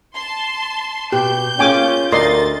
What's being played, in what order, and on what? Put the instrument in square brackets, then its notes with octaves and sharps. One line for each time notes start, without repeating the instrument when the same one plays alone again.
[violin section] A5 C6
[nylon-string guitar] B2 [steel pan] G4 [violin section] G6
[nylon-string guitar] A#3 G#4 [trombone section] C#4 F4 [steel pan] G5 G#5 D6
[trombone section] D2 [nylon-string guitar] A#4 [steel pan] D5 D#5 C6 [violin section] A6